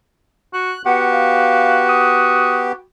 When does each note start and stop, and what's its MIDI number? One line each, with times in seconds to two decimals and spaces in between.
0.53 0.74 66
0.53 0.82 90
0.86 2.72 59
0.86 2.84 66
0.86 2.72 67
0.86 1.03 78
1.12 1.82 77
1.89 2.67 87